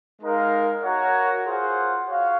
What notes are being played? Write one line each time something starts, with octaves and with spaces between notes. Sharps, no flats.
G#3 D#4 A#4 F5
F#4 A#4 C#5 F#5
F4 G#4 C5 F#5
F#4 C#5 F5